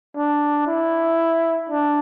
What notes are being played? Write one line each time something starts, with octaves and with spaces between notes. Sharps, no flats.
D4
E4
D4